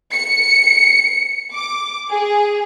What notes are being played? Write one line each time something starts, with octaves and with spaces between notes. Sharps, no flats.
C#7
D6
G#4